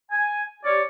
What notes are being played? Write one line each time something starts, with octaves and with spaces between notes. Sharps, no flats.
G#5
G4 C#5 D5